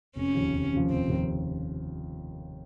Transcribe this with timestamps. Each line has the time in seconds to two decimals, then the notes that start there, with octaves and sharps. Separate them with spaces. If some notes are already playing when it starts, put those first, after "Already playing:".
0.16 F1 C#4
0.35 D#2 C#3 F3
0.54 F1
0.73 D#2 C#3 F3
0.90 F1 C4
1.09 D#2 C#3 F3